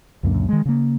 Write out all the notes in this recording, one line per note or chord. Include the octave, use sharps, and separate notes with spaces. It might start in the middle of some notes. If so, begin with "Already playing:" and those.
C#2 F#2 A#2 D3
D#3 G#3
C#3 A#3